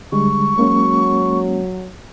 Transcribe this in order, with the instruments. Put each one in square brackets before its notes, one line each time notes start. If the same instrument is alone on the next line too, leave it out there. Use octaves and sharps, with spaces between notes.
[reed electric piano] D3 G3 G#3 [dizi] C#6
[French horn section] F#3 [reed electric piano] G#3 A#3 C#4